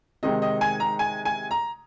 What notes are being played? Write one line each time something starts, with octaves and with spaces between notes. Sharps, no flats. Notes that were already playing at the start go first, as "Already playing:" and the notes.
C3 D#3 G#3 C4 D#4 D#5
D#5
G#5
A#5
G#5
G#5
A#5